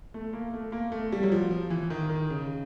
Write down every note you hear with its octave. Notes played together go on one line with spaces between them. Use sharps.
A3
A#3
A3
A#3
A3
G3
F#3
F3
F3
E3
D#3
D#3
C#3